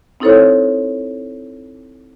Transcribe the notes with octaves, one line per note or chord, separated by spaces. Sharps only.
C4 D#4 E4 A4 C5 C#5